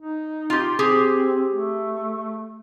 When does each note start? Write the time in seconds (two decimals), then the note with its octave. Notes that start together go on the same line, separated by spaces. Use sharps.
0.01 D#4
0.50 F4 G4
0.79 C4 G4 G#4
1.51 A3